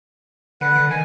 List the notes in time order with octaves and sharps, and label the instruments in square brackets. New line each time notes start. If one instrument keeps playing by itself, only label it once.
[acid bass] D3 [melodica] B4 F#5
[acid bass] D3
[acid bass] D#3 [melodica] G#5